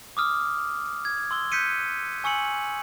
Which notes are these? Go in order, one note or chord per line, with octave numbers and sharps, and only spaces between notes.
D6 D#6 F6
G#6
C6 E6 G7
F#6 G6 B6 C#7 D#7
G#5 C#6 E6 C#7 F#7